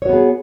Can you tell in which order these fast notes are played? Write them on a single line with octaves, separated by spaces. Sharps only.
C#5 F#4 B3 G#4